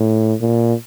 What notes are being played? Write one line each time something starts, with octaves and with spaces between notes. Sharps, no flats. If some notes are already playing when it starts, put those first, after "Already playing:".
Already playing: A2
A#2